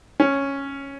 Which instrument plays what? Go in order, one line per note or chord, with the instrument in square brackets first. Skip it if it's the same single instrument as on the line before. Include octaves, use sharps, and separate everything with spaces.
[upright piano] C#4